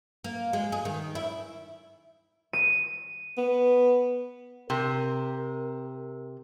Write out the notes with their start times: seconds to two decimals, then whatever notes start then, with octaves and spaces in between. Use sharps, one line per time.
0.24 A#3
0.53 G#3
0.72 G#4
0.85 D#3
1.15 E4
2.53 D#7
3.38 B3
4.70 C3 A#4